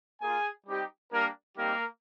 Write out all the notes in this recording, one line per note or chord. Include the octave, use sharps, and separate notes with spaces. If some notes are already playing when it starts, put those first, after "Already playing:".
A#3 F4 G#4 G#5
G3 C4 D#4 G4
G3 A#3 D4 G4 A#4
G3 A#3 C4 D#4 G4 A#4